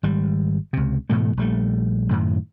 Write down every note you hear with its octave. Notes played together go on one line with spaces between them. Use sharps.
G#1 G3
C#2 C3
G#2 B2 E3 A3
A#1 G3 A3
F#2 A2 D#3